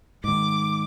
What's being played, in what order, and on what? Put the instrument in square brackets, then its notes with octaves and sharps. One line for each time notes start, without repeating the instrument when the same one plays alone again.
[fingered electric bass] G#2 D#3 [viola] D6